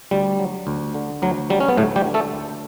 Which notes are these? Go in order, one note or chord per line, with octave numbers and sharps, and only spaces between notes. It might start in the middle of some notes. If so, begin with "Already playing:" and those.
D2 G3
F#3
D2
D3
D2 F#3
F#3 G3
C#4
B3
D2 A2 A3
G3 G4
D3
A3 A4
D2